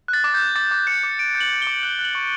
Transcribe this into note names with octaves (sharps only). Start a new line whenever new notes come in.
F#6
A6
D6
G6
F#6
D6 A6
D6
G6 C#7
D6
G6 D7
G6
F#7
G6
G7
D6
F#6 F#7
F#6
F#7
C#6